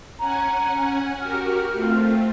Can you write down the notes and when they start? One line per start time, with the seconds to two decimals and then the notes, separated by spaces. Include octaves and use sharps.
0.19 C#4 F#5 G#5 A#5
1.20 F#4 G4 A#4 F6
1.73 A3 C4 F4